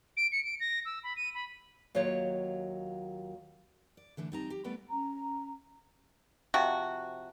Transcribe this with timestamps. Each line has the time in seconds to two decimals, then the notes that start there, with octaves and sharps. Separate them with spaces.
0.17 D7
0.32 C#7
0.44 D7
0.60 A#6
0.85 E6
1.04 B5
1.17 D#7
1.34 B5
1.95 D#2 F#3 F4 C#5
3.97 D5
4.17 D3 E3 A3 D4
4.32 G3 C4 D#4 A5 A#5
4.50 G4
4.64 G3 A3 B3 B4 D5 G5
4.91 C#4 A#5
6.54 C3 F3 F#4